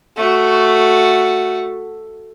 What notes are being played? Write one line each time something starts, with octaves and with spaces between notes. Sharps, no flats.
A3 F#4